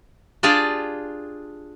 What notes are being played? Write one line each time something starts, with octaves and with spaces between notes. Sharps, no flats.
D4 F4 G4 G#4 D5 A5